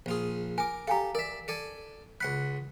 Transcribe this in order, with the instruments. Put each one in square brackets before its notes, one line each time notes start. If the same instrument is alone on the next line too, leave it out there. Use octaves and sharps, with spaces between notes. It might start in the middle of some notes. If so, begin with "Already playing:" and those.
[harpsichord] A#1 F4 G#4
[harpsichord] A#4 D6 [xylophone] G#5
[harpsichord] G4 A4 [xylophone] F5 G#5 A#5
[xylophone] A#4 [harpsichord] D5 E5
[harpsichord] A4 D5 G#5
[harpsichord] C#2 F#5 B5 [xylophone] F#6